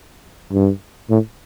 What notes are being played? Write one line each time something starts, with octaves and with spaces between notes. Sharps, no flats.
G2
A2